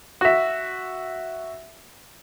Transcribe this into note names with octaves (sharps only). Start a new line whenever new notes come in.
F#4 E5